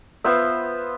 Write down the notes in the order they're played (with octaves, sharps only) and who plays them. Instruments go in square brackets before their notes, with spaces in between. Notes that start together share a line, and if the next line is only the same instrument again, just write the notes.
[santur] B3 F4 C5 E5